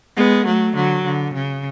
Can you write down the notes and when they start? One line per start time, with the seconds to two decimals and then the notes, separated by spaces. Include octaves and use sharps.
0.16 G#3 B3
0.46 F#3 A3
0.76 D3 F#3
1.04 D3
1.34 C#3